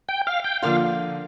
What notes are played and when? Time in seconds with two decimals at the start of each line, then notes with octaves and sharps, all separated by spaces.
0.09 G5
0.27 F5
0.44 G5
0.62 D3 F3 A#3 F4 F5